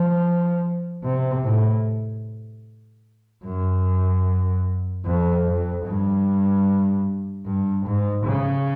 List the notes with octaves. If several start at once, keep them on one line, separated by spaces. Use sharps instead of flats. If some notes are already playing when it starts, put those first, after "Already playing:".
Already playing: F3
C3
A2
F#2
F2
F2
G2
G2
G#2
C#3